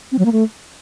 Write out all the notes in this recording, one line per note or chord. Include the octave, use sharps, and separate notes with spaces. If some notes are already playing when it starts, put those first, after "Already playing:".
C4
F#3
A#3
A3